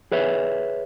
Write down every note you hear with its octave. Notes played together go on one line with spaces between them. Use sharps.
G#4 B4 C#5 E5